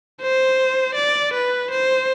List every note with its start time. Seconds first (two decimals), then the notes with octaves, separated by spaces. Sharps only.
0.22 C5
0.95 D5
1.34 B4
1.71 C5